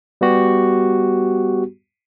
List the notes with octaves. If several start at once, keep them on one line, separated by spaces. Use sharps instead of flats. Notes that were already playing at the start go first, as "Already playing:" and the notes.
G3 B3 F#4 G4